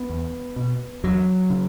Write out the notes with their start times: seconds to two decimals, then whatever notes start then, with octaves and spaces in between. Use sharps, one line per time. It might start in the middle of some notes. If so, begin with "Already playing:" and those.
Already playing: B3
0.09 E2
0.56 B2
1.03 E2 F#3
1.50 C#3